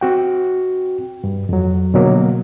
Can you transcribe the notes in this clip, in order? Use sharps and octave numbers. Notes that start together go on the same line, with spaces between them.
C4 F#4 G5
G2
F2 F#3
B2 D3 F#3 A#3 B3